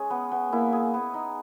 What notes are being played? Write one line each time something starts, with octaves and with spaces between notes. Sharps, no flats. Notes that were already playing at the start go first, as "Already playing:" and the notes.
Already playing: G#3 C#4 G#4
B3
B3
A#3 E4
G#4
B3
D#4